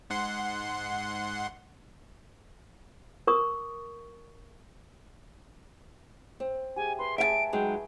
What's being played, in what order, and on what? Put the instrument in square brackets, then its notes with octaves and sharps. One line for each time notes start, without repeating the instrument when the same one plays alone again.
[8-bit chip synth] G#2 F#5 C6
[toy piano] A#4 C#6 D#6
[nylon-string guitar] C4
[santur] G4 G#4 E5 [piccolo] G#5
[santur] B4 E5 [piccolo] C6
[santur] A3 G#4 [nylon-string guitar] E5 F5 A5 [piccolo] D7
[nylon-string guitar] F#3 G#3 D#4 [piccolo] G5